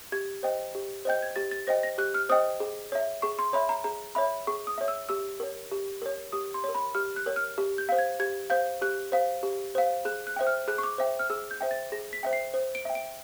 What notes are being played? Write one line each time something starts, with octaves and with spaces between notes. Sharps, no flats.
G4 G#6
C5 D#5 G5
G4
C5 D#5 G5 G6
G#6
G4 A6
A6
C5 D#5 G5 A#6
A#6
G4 F#6
F6
C5 D#5 G5 D#6
G#4
C#5 E5
G#4 C#6
C6
C#5 E5 B5
A#5
G#4 A#5
C#5 E5 B5
G#4 C#6
D#6
C#5 E5
E6
G4 E6
A#4 C#5
G4
A#4 C#5
G4 D#6
C6
A#4 C#5
B5
G4 F6
F#6
A#4 C#5
F6
G4
G6
C5 F5
G#6
G4 G#6
C5 F5 G6
G4 F#6
C5 F5
G4
C5 F5
G#4 F#6
F#6
C5 E5 G5
F6
G#4 F#6
C#6
D6
C5 E5 G5
F6
G#4 E6
G6
C5 E5 G5
A6
G#4 A#6
B6
C5 E5 G5
C7
C5
D7
E5 G5
D7